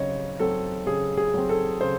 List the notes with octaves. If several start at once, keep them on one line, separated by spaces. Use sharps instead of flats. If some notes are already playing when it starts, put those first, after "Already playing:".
Already playing: C#3 F#3 C4 C#5 D#5
F#3 C4 A4
C#3 G#4
G#4
F#3 C4
A4
C#3 C5